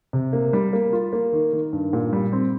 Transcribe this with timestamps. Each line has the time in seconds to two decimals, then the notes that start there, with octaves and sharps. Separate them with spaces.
0.13 C3
0.33 A#3
0.53 G3
0.73 A#3
0.93 F4
1.13 A#3
1.33 D#3
1.53 D#3
1.73 G2
1.93 A#2
2.13 G3
2.33 C4